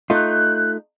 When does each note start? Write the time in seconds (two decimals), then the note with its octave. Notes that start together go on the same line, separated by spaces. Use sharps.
0.10 A3 D#4 F4 F#6 G6